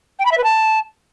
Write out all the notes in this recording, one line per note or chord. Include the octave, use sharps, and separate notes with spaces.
G5
B5
E5
B4
A5